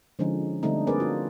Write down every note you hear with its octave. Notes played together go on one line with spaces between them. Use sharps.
D3 F3 G#3 C#4 D#4
D3 G3 A3 C4 D4 D#4
A#3 C4 G#4 A#4 B4 D5
F4 F#4